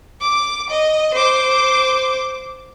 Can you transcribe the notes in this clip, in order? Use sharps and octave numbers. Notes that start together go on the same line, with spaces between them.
D6
D#5
C5 D6